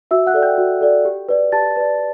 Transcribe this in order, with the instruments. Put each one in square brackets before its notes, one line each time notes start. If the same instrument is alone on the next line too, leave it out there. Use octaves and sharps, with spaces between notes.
[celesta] F#4 E5 E6
F#5 F#6
A4 D5
G5 G6
F#4
A4 D5
G4
B4 D5
G4 A5 A6
B4 D5